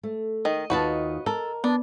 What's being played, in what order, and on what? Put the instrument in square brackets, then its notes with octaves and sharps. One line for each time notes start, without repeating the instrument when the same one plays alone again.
[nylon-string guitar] A3
[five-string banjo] D#3 [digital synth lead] D#5
[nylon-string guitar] D#2 D#4 F4 [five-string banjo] F#4 B4 A5
[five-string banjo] A4 [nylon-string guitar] A#4
[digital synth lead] B3 [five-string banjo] D4